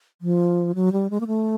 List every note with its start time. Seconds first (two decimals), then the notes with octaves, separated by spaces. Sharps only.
0.22 F3
0.75 F#3
0.92 G3
1.10 G#3
1.20 A#3
1.27 A3